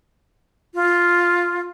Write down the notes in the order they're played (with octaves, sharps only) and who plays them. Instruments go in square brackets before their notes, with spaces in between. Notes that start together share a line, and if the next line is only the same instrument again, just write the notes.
[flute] F4